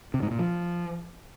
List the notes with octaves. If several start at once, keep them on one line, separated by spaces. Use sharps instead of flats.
C3
G#2
A#2
F3